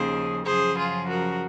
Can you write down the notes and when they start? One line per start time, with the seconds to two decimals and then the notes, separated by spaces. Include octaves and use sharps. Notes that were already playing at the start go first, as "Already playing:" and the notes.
Already playing: D#2 C#3 F3 G#4 C5
0.46 F#2 C#3 F3 G#4 C5
0.77 F4 G#4
1.08 F#4 A#4